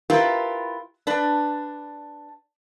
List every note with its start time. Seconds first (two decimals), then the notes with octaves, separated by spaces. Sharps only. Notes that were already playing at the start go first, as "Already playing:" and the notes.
0.10 E4 F4 G4 A#4 B4
1.07 D4 B4 D5